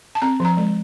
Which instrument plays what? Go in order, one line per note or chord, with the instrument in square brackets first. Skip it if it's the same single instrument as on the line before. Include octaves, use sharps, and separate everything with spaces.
[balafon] A5
C4 A#5
F3 A#5
G#3